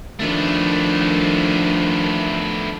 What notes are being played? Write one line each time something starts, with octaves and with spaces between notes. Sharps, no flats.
D#3 F3 A3 B3 D4